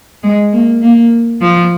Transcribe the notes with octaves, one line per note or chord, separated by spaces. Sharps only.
G#3
A#3
A#3
F3